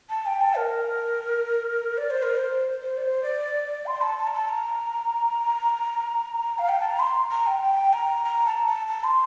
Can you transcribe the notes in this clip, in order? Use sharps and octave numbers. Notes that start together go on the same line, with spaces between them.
A5
G5
A5
A#4
D5
C5
A#4
C5
C5
D5
C5
D5
C6
A5
A5
A#5
A5
A#5
F5
G5
A5
A#5
C6
A#5
G5
G5
A#5
A#5
A5
A5
A5
C6